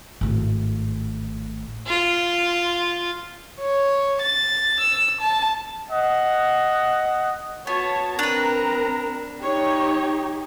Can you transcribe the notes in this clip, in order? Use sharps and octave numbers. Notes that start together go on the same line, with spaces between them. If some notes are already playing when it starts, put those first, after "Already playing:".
G#1 A2
F4
C#5
A6
E6
A5
D#5 F#5
B3 F#4 C#5 A5
C4 D4 A#4 B4 A#5
D#4 G4 C#5